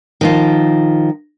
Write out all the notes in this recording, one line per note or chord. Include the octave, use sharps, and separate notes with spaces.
D#3 F3 F4